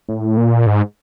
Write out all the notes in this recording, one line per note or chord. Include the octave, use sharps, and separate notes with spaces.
A2
A#2
G#2